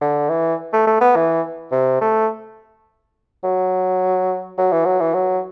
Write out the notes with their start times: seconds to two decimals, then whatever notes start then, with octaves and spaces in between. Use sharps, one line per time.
0.01 D3
0.29 E3
0.73 A3
0.87 A3
1.01 B3
1.16 E3
1.72 C3
2.01 A3
3.44 F#3
4.58 F#3
4.72 E3
4.85 F#3
5.00 E3
5.14 F#3